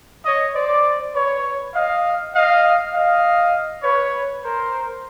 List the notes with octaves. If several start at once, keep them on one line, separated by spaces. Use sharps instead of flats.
C#5 D#5
C5 D5
B4 C#5
D#5 F5
D#5 F5
D#5 F5
B4 C#5
A#4 C5